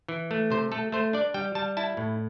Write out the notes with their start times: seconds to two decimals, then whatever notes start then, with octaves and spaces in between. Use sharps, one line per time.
0.09 E3
0.31 A3
0.50 C3 C5
0.72 A3 A4
0.92 A3 C5
1.13 D4 D5
1.34 G3 G5
1.55 G3 A5
1.77 E4 A5
1.97 A2